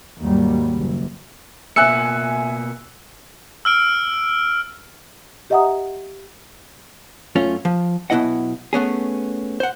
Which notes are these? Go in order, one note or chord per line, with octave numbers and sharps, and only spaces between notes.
D#2 G#2 F#3 G3
F#1
B2 A#3 E5 G#5 E6 F#6 C#7
E6 F6 D7
G4 D#5 E5 F#5 A#5 D#6
F#2 A3 C#4 F4
F3
B1 B2 G#3 E4 D#5 F#5
A3 B3 C#4 G#4
C5 F#5